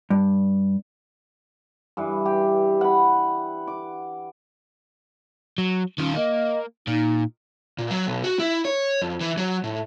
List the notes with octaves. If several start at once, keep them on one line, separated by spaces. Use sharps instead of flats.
G2
G2 E3
G4
F#5 B5
D6
F#3
D#3 C#4 F4
A#3 D#5
A#2 D#4
A#2
F#3
B1
F#4
E4
C#5
F2
E3
F#3
A2